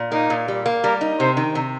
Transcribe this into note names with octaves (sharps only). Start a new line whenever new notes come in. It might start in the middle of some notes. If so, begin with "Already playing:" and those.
Already playing: A#2
A#3 D#4
A#2
G3
A#3
G3 A#4
D#4
C3 C5
D#3
C3